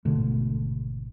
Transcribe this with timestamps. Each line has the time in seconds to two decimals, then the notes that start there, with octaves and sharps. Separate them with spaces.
0.05 G#1 B2 D3 A3